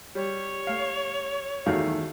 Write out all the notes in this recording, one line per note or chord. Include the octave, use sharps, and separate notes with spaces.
G3 C#5
A3 F5
E2 D#3 A3 F#4 A4 F5